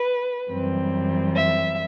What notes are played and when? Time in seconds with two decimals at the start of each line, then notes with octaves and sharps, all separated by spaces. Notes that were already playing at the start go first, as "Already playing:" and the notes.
Already playing: B4
0.51 F#2 E3 G3 C4
1.35 E5